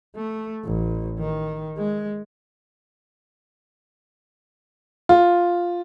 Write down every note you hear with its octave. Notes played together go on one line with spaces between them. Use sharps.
A3
A1
D#3
G#3
F4